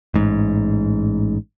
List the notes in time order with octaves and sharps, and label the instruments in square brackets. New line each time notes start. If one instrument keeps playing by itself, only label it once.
[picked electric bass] A1 G#2